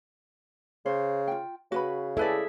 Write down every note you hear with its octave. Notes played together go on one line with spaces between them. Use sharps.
C#3 C5
F4 G5
C#3 F#4 B4 B5
E4 G#4 A4 B4 D5 E5